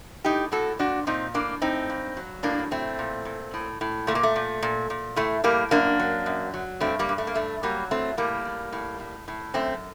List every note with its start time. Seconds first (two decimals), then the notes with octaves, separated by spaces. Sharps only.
0.24 A2 D#4 G4
0.52 A2 F#4 A4
0.79 A#2 D4 F#4
1.07 A#2 C4 D#4
1.34 A2 A#3 D4
1.62 A2 C4 D#4
1.90 G2
2.17 F#3
2.43 A2 A#3 D4
2.71 A2 A3 C4
2.99 A#2
3.25 A#2
3.54 A2
3.81 A2
4.07 A#2 A3
4.15 A#3
4.23 A3
4.36 A#2
4.62 A#2
4.90 A#2
5.16 A2 A3
5.44 A2 G3 A#3
5.71 F#2 A#3 D4
5.99 F#3
6.26 F#2
6.54 F#3
6.80 G2 A3 C4
6.99 G3 A#3
7.09 G2
7.18 A3
7.27 A#3
7.35 G2 A3
7.63 F#3 G3 A#3
7.91 A2 A3 C4
8.17 A2 G3 A#3
8.45 A2
8.72 A2
9.00 A2
9.28 A2
9.54 F#2 A3 C4